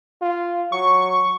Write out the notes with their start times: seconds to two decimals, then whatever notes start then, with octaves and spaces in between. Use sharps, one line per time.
0.22 F4
0.72 F#3 C#6